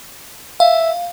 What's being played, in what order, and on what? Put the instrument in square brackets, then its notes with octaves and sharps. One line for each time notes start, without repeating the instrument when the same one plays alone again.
[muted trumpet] E5 [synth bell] F5